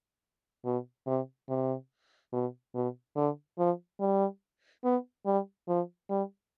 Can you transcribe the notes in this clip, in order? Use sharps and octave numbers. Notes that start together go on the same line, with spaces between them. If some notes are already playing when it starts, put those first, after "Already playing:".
B2
C3
C3
B2
B2
D3
F3
G3
B3
G3
F3
G3